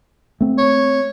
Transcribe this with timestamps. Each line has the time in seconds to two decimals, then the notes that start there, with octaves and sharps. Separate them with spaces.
0.41 A3 C4
0.58 C#5